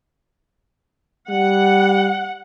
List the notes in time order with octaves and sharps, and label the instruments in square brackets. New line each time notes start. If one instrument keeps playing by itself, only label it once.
[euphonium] G3 [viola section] F#5